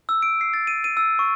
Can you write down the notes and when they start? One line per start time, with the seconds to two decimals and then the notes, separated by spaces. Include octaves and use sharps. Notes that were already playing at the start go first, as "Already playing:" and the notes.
0.09 E6
0.22 D7
0.41 C7
0.54 A6
0.67 D#7
0.84 D#7
0.97 E6
1.19 C#6